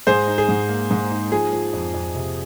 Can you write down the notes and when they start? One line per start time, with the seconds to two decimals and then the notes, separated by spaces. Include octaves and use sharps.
0.07 G#2 G#4 C5
0.27 D#4
0.38 G#4
0.49 G#2
0.69 A#3
0.91 G#2
1.11 D#4
1.32 F3 G#4
1.53 F3
1.73 F2
1.94 F2
2.15 C3